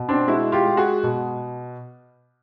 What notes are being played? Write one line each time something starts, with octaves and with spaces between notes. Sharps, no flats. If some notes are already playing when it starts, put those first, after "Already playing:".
Already playing: B2
C4 D4
G#3 E4 F#4
F4 G4
G#3
F#4 G#4
B2